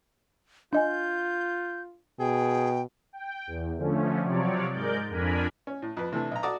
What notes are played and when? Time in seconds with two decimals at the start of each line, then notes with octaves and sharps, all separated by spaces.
0.73 D4 F4 D#5 G#5 G6
2.19 B2 G#4 G5
3.13 G5
3.47 E2
3.77 D3 F3 A3 C#4
4.23 C3 F3 F#3 C#5 D5
4.73 G#2 G#3 A#4 D5 G6
5.09 F2 D4 A#4 G#5 B5
5.67 C#4
5.82 A2
5.97 F2 B4
6.12 C3 E3 A3 D4
6.31 B1 A#5
6.43 F#4 A4 D5 A#5 D6 D#6